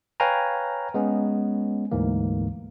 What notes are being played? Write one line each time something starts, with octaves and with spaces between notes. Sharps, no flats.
B4 C#5 F5 G5 G#5 A#5
G#3 B3 C#4
D2 G#2 E3 A#3